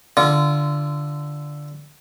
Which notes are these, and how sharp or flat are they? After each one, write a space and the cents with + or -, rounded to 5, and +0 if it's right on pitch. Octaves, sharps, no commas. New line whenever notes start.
D3 +0 F4 -25